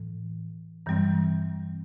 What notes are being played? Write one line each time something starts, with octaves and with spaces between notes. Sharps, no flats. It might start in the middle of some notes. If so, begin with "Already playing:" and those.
Already playing: A2 E3
G2 E3 G3 C4